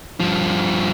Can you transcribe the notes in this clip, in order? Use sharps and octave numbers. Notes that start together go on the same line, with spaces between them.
G2 F3